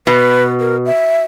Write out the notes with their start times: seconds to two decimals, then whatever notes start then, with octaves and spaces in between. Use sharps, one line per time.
0.07 B2 B4
0.60 A#4
0.86 E5